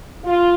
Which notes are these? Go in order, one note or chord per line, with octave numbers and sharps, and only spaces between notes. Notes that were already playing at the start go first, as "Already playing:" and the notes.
F4